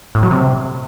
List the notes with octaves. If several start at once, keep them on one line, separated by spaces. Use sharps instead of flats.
A2
F#3
C3